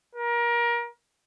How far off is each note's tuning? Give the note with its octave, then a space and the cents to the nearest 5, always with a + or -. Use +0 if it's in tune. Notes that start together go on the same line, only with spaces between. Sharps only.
A#4 +25